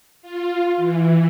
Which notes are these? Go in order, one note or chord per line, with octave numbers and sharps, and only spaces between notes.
F4
E3